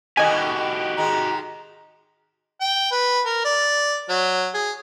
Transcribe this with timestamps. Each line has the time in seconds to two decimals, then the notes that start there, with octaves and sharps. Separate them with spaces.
0.17 B2 D#3 A3 F#4 G4 D#5 G#5
0.97 D#3 G#3 A#5
2.61 G5
2.91 B4
3.26 A#4
3.44 D5
4.09 F#3
4.54 G#4